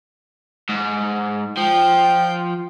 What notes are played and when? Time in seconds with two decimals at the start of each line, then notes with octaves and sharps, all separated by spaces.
0.69 G#2
1.57 F3 G5